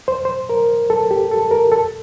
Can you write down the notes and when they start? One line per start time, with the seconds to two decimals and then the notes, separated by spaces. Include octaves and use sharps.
0.08 C5
0.25 C5
0.49 A#4
0.90 A4
1.11 G4
1.31 A4
1.51 A#4
1.72 A4